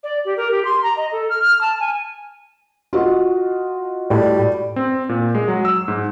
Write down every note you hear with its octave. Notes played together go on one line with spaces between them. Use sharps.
D5
G4
A#4
G4
C6
A#5
D#5
A4
F6
F6
A5
G#5
F4 F#4 D#5
A2 G3
C4
A#2
G#3
F#3
E6
G#2